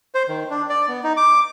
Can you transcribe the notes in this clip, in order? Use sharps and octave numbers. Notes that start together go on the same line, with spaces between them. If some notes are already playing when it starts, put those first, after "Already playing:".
C5
D#3
D4
D5
B3
D#4
D6